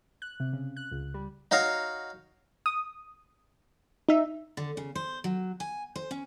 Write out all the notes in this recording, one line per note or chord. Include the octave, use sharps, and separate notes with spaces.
F#6
C3
C#3
F#6
C#2
G3
D#4 F#4 C#5 F5 A#5
D#6
D#4 E5
D3
C#3
C5
F#3
G#5
C5
C#4